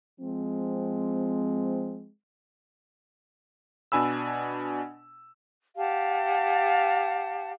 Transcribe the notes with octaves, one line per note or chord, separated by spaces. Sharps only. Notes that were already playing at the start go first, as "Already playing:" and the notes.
F3 G#3 C4
B2 D4 G#5 B5 E6
G4 F5 F#5 A5